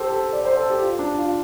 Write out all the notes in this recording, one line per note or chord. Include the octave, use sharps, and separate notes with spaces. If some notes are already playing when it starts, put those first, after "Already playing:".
Already playing: G4 A4 C5
A4
D5
C5
A4
G4
F4
D4
F4